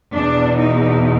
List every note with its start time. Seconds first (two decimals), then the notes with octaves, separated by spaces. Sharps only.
0.14 E2 B2 D4
0.60 D#4